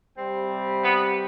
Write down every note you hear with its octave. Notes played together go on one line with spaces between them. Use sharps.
C3 G3 C4
B3 B4